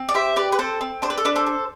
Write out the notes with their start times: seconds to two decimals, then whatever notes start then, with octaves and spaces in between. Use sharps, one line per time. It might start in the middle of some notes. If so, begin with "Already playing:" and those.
Already playing: C4
0.09 D5
0.14 G4 C5 E5
0.36 G4 B4 D5
0.52 B4
0.59 C4 A4 C5
0.81 C4
1.02 D4 C5
1.10 B4
1.18 A4
1.25 D4 B4
1.36 A4 C5
1.46 A4